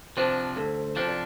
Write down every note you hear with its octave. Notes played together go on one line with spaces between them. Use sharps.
C3 F3 D4 C5
D2 A4
C3 F3 D4 C5
D5